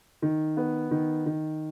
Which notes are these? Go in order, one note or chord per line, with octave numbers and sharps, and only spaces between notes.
D#3
B3
D#3
D#3